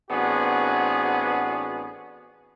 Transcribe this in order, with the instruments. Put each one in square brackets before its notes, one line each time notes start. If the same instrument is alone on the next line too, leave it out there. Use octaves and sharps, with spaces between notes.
[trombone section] A1 B3 C4 D4 F#4 G#4